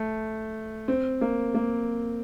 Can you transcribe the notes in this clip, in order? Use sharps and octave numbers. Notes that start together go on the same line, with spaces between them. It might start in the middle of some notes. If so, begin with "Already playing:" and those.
Already playing: A3
C4
A#3
A#3